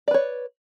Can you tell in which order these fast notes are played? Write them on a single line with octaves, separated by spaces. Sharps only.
D5 B4 C#5